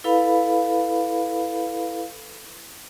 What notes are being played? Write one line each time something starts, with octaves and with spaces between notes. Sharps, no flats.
E4 A4 B4 F5 B5